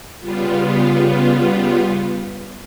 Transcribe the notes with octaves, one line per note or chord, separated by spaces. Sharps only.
C#3 G3 B3 F4